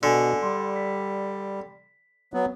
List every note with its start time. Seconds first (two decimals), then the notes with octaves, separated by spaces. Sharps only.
0.03 B2 D3 D4 G#5
0.43 G3 C6
0.76 B6
2.34 F#3 B3